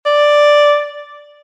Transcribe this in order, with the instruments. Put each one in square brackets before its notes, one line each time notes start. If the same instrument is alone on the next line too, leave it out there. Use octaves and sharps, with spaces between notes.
[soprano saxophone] D5